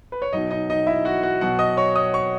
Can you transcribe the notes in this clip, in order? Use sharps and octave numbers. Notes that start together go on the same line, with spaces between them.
B4
C#5
B2 F#3 D#4 D#5
D#4 D#5
D#4 D#5
E4 E5
F#4 F#5
F#4 F#5
B2 F#3 F#4 F#5
D#5 D#6
C#5 C#6
D#5 D#6
C#5 C#6